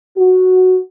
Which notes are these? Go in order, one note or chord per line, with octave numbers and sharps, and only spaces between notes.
F#4